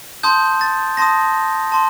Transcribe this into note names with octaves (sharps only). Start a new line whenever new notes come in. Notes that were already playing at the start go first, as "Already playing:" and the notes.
A5 C6 D#6 G6
A6
A5 C6 D#6 A#6
A5 C6